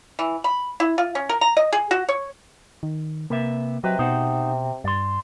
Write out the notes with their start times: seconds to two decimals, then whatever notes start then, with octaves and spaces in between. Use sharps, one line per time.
0.19 E3
0.44 B5
0.80 E4
0.98 F4
1.15 C#4
1.29 A#4
1.41 A#5
1.57 D#5
1.73 G#4
1.91 F#4
2.09 C#5
2.83 D#3
3.30 C3 A#3 B4 E5
3.84 C3 F#3 B4 D#5
3.99 B2 D#4 C5 F#5
4.84 G2 D5 C6